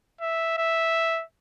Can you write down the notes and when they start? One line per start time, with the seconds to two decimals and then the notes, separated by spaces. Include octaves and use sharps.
0.21 E5
0.58 E5